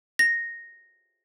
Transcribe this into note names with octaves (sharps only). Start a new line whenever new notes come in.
A#6